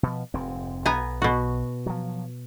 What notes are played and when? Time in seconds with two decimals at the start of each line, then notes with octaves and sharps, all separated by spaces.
0.03 B2 F3
0.34 F1 G#2 C4
0.86 B1 B3 G#5 A#5
1.22 B2 F#4
1.86 F3 F#3